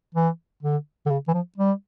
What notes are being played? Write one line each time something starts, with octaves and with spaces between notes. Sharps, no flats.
E3
D3
D3
C#3
E3
F3
G3